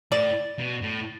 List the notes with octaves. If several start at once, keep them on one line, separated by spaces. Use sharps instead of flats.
A2 D5
B2
A2